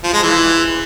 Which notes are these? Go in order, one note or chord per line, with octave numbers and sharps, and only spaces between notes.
F3
G#3
E3